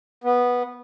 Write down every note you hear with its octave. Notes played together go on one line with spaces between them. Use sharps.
B3